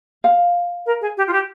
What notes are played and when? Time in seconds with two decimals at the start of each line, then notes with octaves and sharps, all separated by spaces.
0.24 F5
0.85 A#4
1.01 G#4
1.17 G4
1.27 F4
1.32 G4